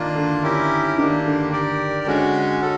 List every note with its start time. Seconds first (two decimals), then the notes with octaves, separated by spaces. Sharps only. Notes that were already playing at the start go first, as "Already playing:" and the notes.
Already playing: D#3 A#3 D4 F4
0.16 D3
0.43 C#4 E4 G4 A#4
0.98 D#3 A#3 D4 G4
1.26 D3
1.52 G4 A#4 D5
2.06 D3 G#3 C#4 F#4
2.61 F#4 A4